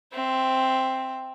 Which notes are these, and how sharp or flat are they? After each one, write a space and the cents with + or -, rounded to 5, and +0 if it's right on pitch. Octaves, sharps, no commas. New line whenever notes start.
C4 +0 E5 +10